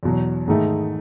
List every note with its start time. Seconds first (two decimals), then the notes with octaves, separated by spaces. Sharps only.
0.03 E2 B2 F#3
0.48 G#2 D#3 A3 D#4 G#4